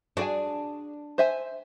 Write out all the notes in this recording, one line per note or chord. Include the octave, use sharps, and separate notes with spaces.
D4 F#4 G#4 G#5
C5 E5 G#5